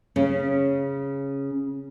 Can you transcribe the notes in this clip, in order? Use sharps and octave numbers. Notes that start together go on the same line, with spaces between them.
C#3 C#4